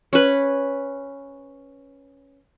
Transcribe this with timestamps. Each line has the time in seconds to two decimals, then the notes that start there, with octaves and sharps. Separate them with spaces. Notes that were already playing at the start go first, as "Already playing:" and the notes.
0.13 C#4 B4